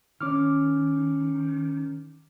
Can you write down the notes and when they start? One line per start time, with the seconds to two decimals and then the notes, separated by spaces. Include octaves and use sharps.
0.21 D#3 C#4 D6 F6